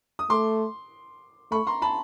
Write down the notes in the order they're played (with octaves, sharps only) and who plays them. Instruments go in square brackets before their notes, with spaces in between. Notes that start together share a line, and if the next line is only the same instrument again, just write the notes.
[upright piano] D#6
[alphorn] A3 [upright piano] C6 D6
[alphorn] A3 [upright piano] B5 C#6
[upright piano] A#5 C6
A5 B5